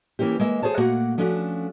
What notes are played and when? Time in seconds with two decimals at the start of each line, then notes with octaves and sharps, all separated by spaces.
0.19 E3 A#3 C#4 E4 G4
0.39 G#3 A#3 E5
0.63 G#4 C5 C#5 A5
0.77 A#2 A3 A#3 F#4 F#5
1.18 F3 A3 C#4 D4 F#4